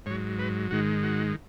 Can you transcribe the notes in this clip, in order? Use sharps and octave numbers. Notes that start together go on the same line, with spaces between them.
G#2 F#3 C#5
B4
G#2 D#3 G#3 F#4
F#4